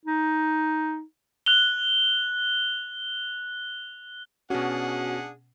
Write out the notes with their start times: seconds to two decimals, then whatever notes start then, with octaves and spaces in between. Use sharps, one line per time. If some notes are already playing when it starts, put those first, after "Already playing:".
0.05 D#4
1.46 F#6 F7 G7
4.50 B2 C#4 D4 F#4 G#4 F#5